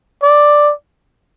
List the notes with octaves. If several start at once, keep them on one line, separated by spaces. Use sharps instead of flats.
D5